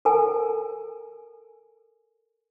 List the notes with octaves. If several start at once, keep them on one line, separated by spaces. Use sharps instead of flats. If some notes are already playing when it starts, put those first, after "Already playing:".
A4 A#4 G#5